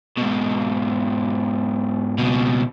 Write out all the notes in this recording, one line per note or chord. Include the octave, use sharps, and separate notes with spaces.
G#2 B2
C#2 B2